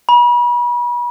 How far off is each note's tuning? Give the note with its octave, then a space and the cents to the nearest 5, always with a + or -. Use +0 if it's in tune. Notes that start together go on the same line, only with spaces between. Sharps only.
B5 -40